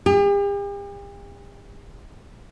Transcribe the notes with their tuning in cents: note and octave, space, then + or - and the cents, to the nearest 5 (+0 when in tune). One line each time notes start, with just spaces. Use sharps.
G4 +45